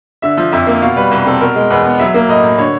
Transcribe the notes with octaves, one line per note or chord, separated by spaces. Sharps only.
D3 E5
F3
F2 E5
A#3
B2 F5
G3 B4
C2 B4
C4 A4
B2 A#4
G#3
E2 B4
B3
F#3 E5
A#3
A2 D#5
A2
D3 C#5